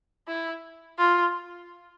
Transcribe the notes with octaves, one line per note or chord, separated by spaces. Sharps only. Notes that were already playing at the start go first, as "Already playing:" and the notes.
E4
F4